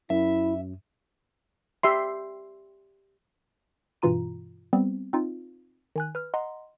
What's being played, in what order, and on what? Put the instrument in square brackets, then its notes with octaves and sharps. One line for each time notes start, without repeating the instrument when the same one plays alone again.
[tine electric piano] F#2 [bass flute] E4 [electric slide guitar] E5
[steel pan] G4 E5 C6
[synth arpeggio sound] G2 B2 E3 F4 A#5 D#7
G3 B3 C4
C4 D#4 F4
D#3 G#5 F#6
B4 F6
D#5 F#5 A#5 C6